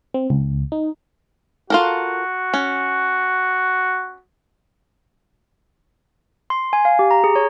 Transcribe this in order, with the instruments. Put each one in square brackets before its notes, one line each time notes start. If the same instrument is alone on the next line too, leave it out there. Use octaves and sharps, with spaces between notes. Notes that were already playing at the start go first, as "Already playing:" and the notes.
[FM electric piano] C4
C#2
D#4
[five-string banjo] F4 A4 A#4 [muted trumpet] F#4
[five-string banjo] C#4
[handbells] C6
G#5
F5
G4
A#5
G#4
C#5